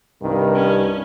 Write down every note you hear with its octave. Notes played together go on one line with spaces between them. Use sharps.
C2 G2 D#3
C#4